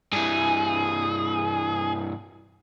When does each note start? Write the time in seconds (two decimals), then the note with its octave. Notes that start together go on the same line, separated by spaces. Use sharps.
0.12 G2 E3 G#4